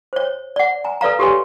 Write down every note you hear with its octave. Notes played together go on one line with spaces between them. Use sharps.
C5 C#5
D5 F#5
G#5 A#5
A4 B4 D5 F5 A#5
F#4 G4 A4 B4 C#5 G#5